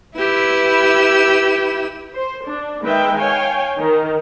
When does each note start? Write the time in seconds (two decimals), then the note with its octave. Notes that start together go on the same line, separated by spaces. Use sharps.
0.16 E4 G4 B4 E6
2.13 C5
2.44 D4
2.82 D#3 G#3 B3 B4 E5 G5
3.16 C#5 F5 G5 G#5
3.79 D#3